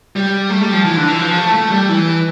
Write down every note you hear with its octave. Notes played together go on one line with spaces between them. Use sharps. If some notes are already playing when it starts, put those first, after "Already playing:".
G3
A3
G3
F3
E3
D3
E3
F3
A3
A3
G3
E3